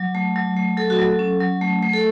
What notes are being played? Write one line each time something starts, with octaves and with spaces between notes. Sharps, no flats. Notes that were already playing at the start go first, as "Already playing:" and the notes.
Already playing: F#3
A3
F#3
A3
F#3 A4
F#4
F#3 A4
C#4
F#3
A3
A3
A4